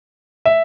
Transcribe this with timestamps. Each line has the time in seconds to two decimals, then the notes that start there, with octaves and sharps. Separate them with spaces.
0.45 E5